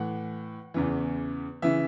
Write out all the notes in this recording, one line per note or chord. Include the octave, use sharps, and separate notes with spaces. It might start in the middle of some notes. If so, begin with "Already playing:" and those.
Already playing: A2 E3 F#5
E2 C#3 E3
C#3 E3 E5